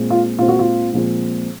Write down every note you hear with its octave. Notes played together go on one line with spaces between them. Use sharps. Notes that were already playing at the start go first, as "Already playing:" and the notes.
Already playing: A#2 G#3 C4
F4
A#2 G#3 C4 F4
F#4
F4
A#2 F3 G#3 C4